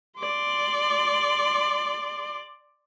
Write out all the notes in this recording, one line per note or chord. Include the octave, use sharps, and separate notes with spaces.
D5 C6